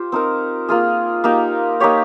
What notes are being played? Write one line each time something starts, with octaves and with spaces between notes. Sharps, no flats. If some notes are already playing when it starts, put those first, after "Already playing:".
Already playing: F4 G4 C5
C4 D#4 A#4
A#3 F4 G#4
A#3 D#4 G4
A#3 D#4 G4 C#5